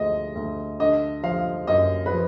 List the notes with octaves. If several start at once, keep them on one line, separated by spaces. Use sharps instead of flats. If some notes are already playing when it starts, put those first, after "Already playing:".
Already playing: D2 F3 G#3 D#5
D2
D3 D#5
F3 F5
F#2 D#5
B4
F3